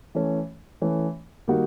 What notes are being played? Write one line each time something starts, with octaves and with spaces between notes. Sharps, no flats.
E3 A3 C#4
E3 A3 C#4
D#3 G3 A#3 D#4 F#4